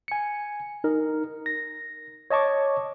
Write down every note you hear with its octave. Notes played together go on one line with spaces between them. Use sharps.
G#5 C#7
D#4 A#4
A#6
C#5 D#5 A5 C#6 D6